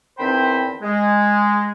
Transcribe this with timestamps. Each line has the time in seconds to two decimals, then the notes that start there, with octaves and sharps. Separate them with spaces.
0.19 E2 D#3 C4 C5 G5 B5
0.82 G#3